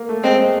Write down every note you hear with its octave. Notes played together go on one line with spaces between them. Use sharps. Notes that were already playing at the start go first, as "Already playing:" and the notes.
Already playing: A#3
A3
G#3 C4